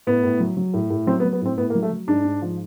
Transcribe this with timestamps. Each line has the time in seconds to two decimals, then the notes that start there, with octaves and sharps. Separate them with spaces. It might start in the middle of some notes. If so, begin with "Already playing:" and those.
0.07 A2 B3
0.24 A2
0.40 F#3
0.57 F#3
0.74 A2
0.90 A2
1.07 F#3 C4
1.20 B3
1.25 F#3
1.33 B3
1.41 A2 C4
1.57 A2 B3
1.70 A#3
1.75 F#3
1.83 A3
1.91 F#3
2.07 G#2 D4
2.25 G#2
2.42 F3